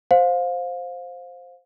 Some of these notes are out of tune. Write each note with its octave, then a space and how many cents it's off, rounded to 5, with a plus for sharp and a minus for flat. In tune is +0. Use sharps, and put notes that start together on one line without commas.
C5 +0 F5 +25